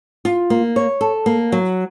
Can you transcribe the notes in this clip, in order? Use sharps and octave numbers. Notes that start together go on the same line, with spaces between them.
F4
A#3
C#5
A4
A#3
F#3